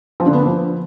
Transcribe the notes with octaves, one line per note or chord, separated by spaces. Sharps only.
F3
D3
B3
A#3
F3